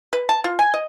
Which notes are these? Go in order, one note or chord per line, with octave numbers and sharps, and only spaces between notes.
B4
A5
F4
G#5
D#5